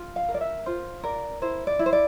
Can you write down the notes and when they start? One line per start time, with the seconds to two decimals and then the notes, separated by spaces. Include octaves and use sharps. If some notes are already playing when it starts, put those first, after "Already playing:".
Already playing: F4
0.16 F5
0.28 A#4
0.34 D5
0.41 E5
0.66 F4 C5
1.04 A#4 D5
1.42 E4 C5
1.67 D5
1.79 E4
1.86 C5
1.93 D5